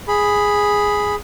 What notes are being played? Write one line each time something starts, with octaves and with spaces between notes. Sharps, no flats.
G#4 B5